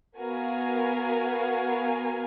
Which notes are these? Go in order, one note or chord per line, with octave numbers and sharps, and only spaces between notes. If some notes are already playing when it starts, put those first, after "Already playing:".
B3 F#4 A#4 F5 G#5